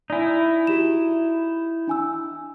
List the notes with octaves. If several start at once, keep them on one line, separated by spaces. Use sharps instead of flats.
D#4 E4 D5 G#5
F#4 G4 E7
D4 G#5 E6